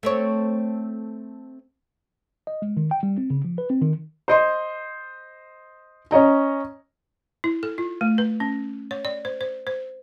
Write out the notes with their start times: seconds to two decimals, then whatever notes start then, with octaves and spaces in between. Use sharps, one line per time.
0.03 A3 C4 C#5
2.47 D#5
2.62 G#3
2.77 D#3
2.91 G5
3.03 G3
3.18 C4
3.30 C#3
3.45 F3
3.58 B4
3.70 C4
3.82 D#3
4.28 C5 D#5 C6
6.11 C#4 C#5 D#5 A#5
7.44 E4
7.63 A4
7.78 F4
8.01 A3
8.18 B4
8.40 C#4
8.91 C#5
9.05 D5
9.25 C5
9.41 C5
9.67 C5